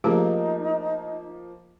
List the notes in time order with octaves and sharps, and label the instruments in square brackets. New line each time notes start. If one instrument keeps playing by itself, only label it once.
[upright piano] F3 A#3 [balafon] A3 G4 G#4 [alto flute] D#4